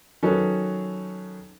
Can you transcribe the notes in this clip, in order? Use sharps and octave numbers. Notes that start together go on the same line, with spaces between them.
D#3 F#3 C#4 D#4 A4 B4